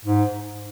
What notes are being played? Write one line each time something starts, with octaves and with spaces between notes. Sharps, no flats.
G#2